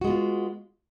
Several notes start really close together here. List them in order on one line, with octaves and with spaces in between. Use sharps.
F#4 G#3 B3 F4